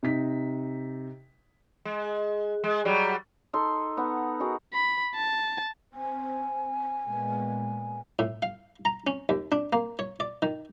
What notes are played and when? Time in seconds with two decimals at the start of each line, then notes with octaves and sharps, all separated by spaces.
0.03 C3 D#4 B6
1.85 G#3
2.64 G#3
2.85 F#3 G3
3.53 D#4 A4 C6
3.97 B3 D#4 F#5
4.40 D#4 F#4 G#4 A#4
4.73 B5
5.15 A5
5.94 C4 G#5
7.04 A#2 G#3 B3
8.19 A2
8.42 F5
8.85 A#5
9.07 C#4
9.29 D#2
9.52 D4
9.73 A#3
9.99 C#5
10.20 D5
10.42 D#3